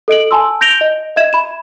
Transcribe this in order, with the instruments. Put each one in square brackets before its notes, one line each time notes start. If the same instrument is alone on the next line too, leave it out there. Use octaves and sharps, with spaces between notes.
[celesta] A4 D#5 D7 F#7
G#5 A5 C6 E6
G6 A#6 D7 F7 G7
D#5
D#5 E5 G#6 E7
B5 E7